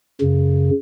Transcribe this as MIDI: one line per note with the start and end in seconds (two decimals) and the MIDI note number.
0.21 0.70 42
0.21 0.70 49